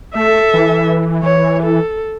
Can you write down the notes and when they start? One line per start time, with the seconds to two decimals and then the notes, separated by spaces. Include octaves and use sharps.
0.15 A3 A4 E5
0.54 E3
1.23 E3 C#5
1.62 A4